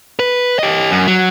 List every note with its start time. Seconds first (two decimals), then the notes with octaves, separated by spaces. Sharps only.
0.19 B4
0.59 G4 D#5
0.90 F#2
1.07 F#3